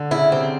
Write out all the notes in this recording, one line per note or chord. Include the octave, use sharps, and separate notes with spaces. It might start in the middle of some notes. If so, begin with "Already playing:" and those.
Already playing: D3
C#3 E4
C3 C4